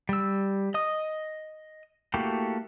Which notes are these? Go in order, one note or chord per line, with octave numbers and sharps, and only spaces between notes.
G3 E6
D#5 D#6
A3 A#3 E4 F#4 G4